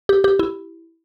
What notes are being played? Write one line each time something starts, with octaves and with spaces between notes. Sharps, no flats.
G4
G4
E4